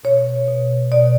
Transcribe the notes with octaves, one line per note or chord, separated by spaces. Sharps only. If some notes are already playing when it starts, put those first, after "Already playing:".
B2 C#5
B2
B2 D5